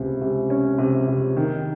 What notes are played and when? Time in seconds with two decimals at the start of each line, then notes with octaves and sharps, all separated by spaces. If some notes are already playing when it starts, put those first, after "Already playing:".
Already playing: C#2 C3
0.22 C3
0.50 C#4
0.78 C3
1.07 C3
1.37 D#3